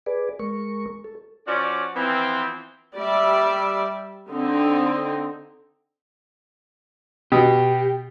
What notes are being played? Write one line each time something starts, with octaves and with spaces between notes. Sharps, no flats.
G#4 B4 D5
G#3 A#4 C#6
A4
F3 C#4 F#4 D5
E3 F3 B3 C4
G3 D5 E5
D3 C4 D#4
B2 G4